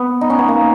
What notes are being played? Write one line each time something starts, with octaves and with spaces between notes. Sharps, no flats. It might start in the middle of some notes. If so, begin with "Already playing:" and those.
Already playing: B3
D#4
C#4
B3
A#3